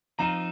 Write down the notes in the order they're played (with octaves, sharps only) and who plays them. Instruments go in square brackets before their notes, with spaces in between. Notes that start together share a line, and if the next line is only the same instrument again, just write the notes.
[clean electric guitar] F3 C4 D#4 [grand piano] F5 A#5